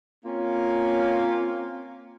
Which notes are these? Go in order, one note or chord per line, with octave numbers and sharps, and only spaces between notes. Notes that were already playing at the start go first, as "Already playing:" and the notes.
A#3 C4 C#4 F4